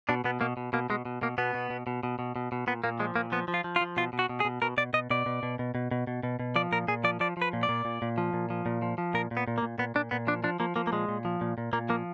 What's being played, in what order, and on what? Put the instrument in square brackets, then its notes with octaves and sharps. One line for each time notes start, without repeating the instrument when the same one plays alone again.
[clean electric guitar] B2 D4
B2 B3
B2 A#3
B2
B2 A#3
B2 G#3
B2
B2 A#3
B2 B3
B2
B2
B2
B2
B2
B2
B2
A#2 B3
A#2 A#3
F3 G#3
A#2 A#3
F3 B3
F3
F4
F3
F4
F3
B2 F4
B2
F#4
B2
G#4
B2
B2 A#4
B2 D5
B2 D#5
B2 D5
B2
B2
B2
B2
B2
B2
B2
B2
F3 D5
A#2 A#4
A#2 G#4
F3 D5
F3 D5
F3 B4
A#2
D5
A#2
A#2
A#2
F3
A#2
F3
A#2
F3
F3
A#2 A#4
A#2
B3
A#2
A#3
A#2
A#2 B3
A#2 D4
A#2 B3
F3 D4
F3 D4
F3 A#3
F3 A#3
A#3
A#2 G#3
A#2
F3
A#2
A#2
A#2 A#3
F3 A#3